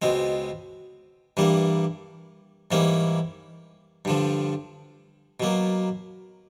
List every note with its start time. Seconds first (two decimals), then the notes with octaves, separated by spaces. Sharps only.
0.02 C#2 B2 G#3 C4
1.37 G2 E3 G3 A#3
2.71 G#2 E3 G3 A#3 C#4
4.05 G2 D3 F3
5.40 B2 F#3 A#3